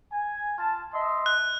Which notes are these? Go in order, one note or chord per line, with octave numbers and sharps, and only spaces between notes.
G#5
F4 A5
D#5 E5 C6
F#6